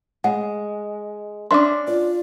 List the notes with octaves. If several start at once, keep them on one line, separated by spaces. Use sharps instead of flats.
G#3 F#5
C#4 D4 E5 C6 D6
F4 D5